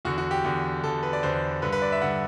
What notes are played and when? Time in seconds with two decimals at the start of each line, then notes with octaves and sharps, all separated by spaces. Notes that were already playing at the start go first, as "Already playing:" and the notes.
0.05 E2 D3 F#4
0.18 F#4
0.31 G4
0.44 E2 D3
0.83 E2 D3 A4
1.03 B4
1.13 D5
1.23 E2 D3 C5
1.62 G2 D3 B4
1.72 B4
1.82 D5
1.92 E5
2.02 G2 D3 F#5